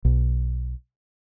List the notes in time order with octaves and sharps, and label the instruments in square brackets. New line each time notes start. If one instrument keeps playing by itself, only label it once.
[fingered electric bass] B1